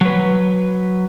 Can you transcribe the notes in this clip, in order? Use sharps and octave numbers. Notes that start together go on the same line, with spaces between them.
F#3 B4